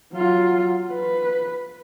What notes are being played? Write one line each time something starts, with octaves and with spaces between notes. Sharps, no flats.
F#3 F4
B4